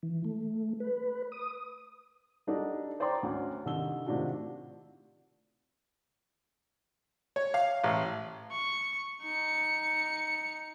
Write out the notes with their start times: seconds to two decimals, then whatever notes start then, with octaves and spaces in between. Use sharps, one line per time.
0.03 E3
0.24 A3
0.80 B4
1.32 D#6
2.47 G3 D4 D#4 F#4 A4
3.00 C5 D5 G5 A#5 C6
3.23 D2 C#4 F#5
3.65 C2 D3 D#3 E6 G7
4.07 A2 C3 D#3 D4 F4 F#4
7.36 C#5
7.54 F5
7.84 A1
8.52 C#6
9.22 D#4 C#7